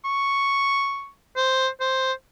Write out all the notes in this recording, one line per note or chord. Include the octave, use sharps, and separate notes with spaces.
C#6
C5
C5